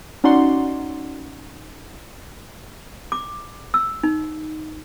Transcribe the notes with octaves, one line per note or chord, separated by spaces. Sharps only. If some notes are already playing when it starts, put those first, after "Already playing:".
C#4 D#4 F#4 D5 F#5 C6
D6
E6
D#4